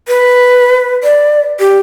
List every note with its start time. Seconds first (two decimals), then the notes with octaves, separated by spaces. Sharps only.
0.08 B4
1.03 D5
1.59 G4